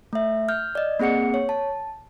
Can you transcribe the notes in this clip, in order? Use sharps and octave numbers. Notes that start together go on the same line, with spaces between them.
A3 E5
F6 G6
D5 D#5
A#3 C4 G#4 F#5 C#7
C#5
A5